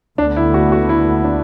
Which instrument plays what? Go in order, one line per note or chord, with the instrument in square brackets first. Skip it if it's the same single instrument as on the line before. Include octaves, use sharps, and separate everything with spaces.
[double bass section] D2 D3 B3 [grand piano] D4
[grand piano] E4
F#4
F#4
E4
D4